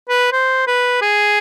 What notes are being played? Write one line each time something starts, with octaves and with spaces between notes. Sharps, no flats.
B4
C5
B4
G#4